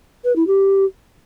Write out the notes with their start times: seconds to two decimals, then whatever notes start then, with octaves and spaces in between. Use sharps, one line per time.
0.24 B4
0.36 E4
0.47 G4